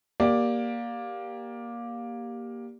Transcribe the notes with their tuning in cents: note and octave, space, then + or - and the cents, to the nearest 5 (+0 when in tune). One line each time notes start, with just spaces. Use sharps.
A#3 +15 G4 +0 D5 +0